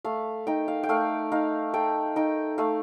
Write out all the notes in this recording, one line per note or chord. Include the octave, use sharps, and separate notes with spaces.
A3 F5
D#4 G5
F5
G5
A3 F5
D#4 F5
A3 G5
D#4 G5
A3 F5